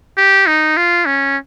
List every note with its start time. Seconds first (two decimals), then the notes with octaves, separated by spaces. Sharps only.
0.17 G4
0.47 D#4
0.77 F4
1.06 C#4